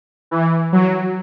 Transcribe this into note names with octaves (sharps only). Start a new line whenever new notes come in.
E3
F#3